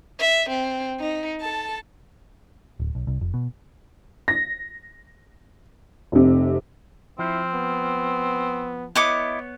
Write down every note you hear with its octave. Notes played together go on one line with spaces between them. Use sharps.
E5
C4
D#4
A4 A5
D1
B1
C2
F1
B2
A#6
F1 C3
F3 C4 E4
B3
B3 E4 C#5 D#5 D6